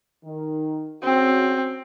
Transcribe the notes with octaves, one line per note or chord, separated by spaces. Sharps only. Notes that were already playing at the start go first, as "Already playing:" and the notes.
D#3
C#3 C4 C#4 F#4